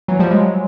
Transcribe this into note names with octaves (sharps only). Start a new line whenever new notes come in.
E3 F#3
F3 G3
F#3 G#3